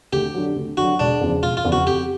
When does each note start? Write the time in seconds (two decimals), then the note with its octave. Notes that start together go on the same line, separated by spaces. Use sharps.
0.13 D2 G4
0.34 D3 F#3
0.56 D2
0.77 D3 F#3 F#4
0.99 E1 D4
1.21 E2 C#3 F3
1.42 E1 F4
1.57 F4
1.65 E2 C#3 F3
1.72 F#4
1.86 F2 G4